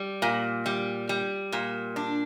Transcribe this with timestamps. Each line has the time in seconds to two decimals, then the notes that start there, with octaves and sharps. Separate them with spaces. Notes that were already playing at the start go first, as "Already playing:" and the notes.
Already playing: G3
0.22 A#2
0.66 G3
1.09 G3
1.52 A#2
1.96 D4